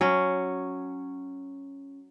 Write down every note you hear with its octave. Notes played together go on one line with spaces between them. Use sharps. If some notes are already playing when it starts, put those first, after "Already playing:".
F#3 C#4